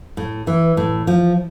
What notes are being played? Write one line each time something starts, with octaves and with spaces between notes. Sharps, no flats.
A2
E3
A2
F3